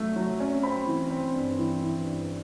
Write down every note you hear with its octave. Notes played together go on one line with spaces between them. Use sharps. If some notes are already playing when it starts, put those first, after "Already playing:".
Already playing: F#3 A3
F#3
C#4
C4 B5
E3
C4
G2
E3
E3
G2